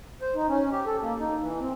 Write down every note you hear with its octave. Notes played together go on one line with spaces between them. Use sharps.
C5
D#4
C#4
G4
A4
A#3
D#4
E3
C4